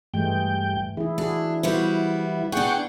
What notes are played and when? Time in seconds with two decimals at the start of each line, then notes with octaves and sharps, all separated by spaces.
0.14 G2 E3 G#3 A3 G5
0.97 E3 E4 G#4
1.18 D4 E4 F#4 G#4
1.63 G3 B3 E4 F#4 C5
2.52 B3 D4 E4 G#4 F#5 G5 C#6